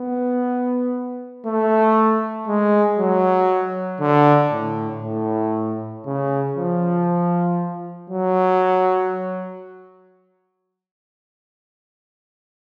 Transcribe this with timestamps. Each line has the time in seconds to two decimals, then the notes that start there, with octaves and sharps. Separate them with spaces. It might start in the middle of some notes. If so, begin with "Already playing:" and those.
Already playing: B3
1.46 A3
2.48 G#3
2.99 F#3
4.01 D3
4.52 A2
5.03 A2
6.06 C#3
6.57 F3
8.10 F#3